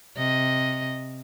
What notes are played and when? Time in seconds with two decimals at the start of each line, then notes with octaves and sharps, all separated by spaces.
0.17 C3 D#5